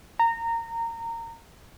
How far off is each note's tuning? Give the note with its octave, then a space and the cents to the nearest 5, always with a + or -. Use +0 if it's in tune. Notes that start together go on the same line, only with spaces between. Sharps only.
A#5 -20